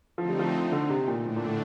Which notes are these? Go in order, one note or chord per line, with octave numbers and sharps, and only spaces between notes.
D3 F3 A3 C4 D#4
G3
F3
D3
C3
A#2
A2 D3 A3 D4
A#2
A2